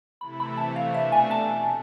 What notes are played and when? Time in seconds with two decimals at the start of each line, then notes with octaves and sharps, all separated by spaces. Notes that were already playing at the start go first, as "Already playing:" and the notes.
0.21 C3 E3 A3 E4 B5
0.40 B5
0.57 C3 E3 A3 A5
0.76 F5
0.94 B2 A3 D4 E5
1.12 G#5
1.31 A5